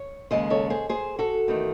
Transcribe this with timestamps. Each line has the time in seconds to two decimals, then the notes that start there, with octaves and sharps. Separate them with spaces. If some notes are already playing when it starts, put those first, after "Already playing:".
Already playing: C#5
0.31 D#2 C#3 G#3 C5 D#5
0.50 A4 C#5
0.70 G#4 C5
0.89 G#4 C5
1.19 F#4 A4
1.48 E2 D#3 A3